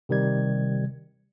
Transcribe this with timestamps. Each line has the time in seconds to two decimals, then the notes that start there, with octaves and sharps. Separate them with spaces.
0.09 C3 D#3 G3 G#6